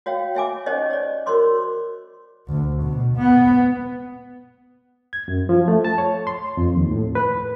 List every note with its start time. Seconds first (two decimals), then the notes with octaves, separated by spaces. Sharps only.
0.06 F#4 C#5 F5 G5
0.35 C#5 E5 G#5 D6
0.66 C#4 D#4 G4 C5 C#5 D#5
0.90 C#5 D5
1.26 F#4 A#4 C5 C#5 C6 D6
2.48 D2
2.82 B2
3.17 B3
5.13 G#6
5.28 F#2
5.49 F3
5.68 A3
5.85 A5
5.98 C#5
6.27 C6
6.57 F2
6.75 D#2
6.91 A2
7.15 B4